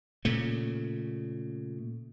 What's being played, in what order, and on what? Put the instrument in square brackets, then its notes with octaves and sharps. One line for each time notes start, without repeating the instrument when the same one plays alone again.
[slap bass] A#2 C#3 A3